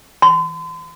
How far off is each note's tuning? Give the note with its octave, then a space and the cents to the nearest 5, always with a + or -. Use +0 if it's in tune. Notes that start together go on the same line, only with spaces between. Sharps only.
C6 -45